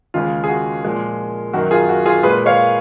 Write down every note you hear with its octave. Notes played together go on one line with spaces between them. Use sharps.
D#2 C#3 G#3 F4
G#4
F#4
A#2 F3 G#3
F#2 D#3 F#3 F#4
F4 G#4
F#4
F4 G#4
A#2 G#3 G#4 B4
C#5 F5